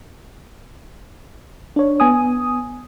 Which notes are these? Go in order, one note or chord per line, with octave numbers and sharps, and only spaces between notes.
D4 C#5
B3 G#5 D#6